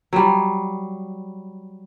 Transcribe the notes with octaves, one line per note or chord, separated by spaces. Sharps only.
F#3 G3